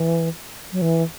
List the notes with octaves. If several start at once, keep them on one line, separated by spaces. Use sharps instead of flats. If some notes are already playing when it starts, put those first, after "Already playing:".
Already playing: E3
F#3
E3